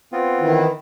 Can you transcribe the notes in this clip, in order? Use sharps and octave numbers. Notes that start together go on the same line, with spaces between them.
B3 C4 F4
D#3 E3 E4